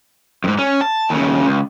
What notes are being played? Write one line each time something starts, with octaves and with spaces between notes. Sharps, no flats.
F2 G#2
C#4
A5
D#2 C#3
C#2